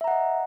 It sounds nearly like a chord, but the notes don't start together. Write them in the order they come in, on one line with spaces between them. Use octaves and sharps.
E5 A#5 F#5 D#5